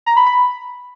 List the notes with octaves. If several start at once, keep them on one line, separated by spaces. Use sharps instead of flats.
A#5
B5
B5